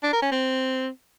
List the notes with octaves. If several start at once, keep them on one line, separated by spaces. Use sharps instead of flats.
D4
A#4
C#4
C4